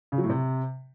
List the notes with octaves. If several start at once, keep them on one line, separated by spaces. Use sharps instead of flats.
C#3
F#3
A2
C3